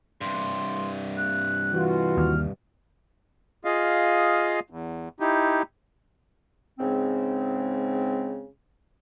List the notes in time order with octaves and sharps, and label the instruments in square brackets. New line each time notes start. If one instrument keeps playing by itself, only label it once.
[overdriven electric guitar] G2 C3 [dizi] C6
[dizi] F#6
[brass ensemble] E3 F4 F#4
[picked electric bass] D#2 [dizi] F6
[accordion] F4 G#4 D#5 F5
E2
D#4 E4 G4
[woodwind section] G#2 C#3 G#3 C4